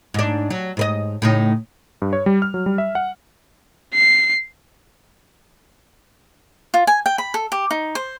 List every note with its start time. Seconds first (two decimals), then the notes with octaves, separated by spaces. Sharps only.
0.14 G#2 D4
0.50 F#3
0.77 G#2 B4 D#5
1.22 A2 C#3 D#4
2.02 G2
2.13 C#5
2.26 G3
2.42 F6
2.54 F#3
2.66 G3
2.78 E5
2.95 F#5
3.94 C7
6.74 F4
6.87 G#5
7.06 G5
7.18 B5
7.34 A4
7.52 G4
7.71 D#4
7.95 C5